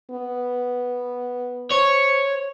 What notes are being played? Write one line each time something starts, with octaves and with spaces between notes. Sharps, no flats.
B3
C5 C#5